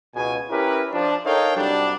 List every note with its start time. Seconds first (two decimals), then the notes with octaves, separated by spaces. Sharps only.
0.15 C#2 B2 G#5
0.50 C#4 E4 G4 A#4 B4
0.92 F3 D4
1.25 D#4 A4 A#4 C#5 F5 G5
1.56 C2 F#3 G3 D4